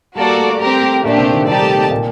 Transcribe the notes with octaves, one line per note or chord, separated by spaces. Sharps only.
G3 A#3 F#4 A4 D5
A3
G3 C4 G4 A#4
A3
A#2 A3 A#3 D4 G4
C3 C4
D#3 D#4
G3 D#4 G4 D5 A5
A3
A3
A#2 A#3